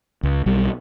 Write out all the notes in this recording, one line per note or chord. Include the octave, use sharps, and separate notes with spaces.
C#2
B1 G3